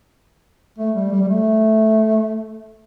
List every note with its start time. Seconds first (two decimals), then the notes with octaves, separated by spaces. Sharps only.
0.78 A3
0.95 G3
1.11 G3
1.22 G3
1.28 A3